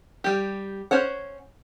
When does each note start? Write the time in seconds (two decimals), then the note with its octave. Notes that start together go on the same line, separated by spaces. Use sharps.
0.24 G3 G4
0.91 C#4 C5 C#5 F#5